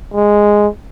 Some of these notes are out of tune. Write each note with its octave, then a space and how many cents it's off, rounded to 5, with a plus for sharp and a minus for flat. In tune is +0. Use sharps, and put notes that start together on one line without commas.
G#3 -5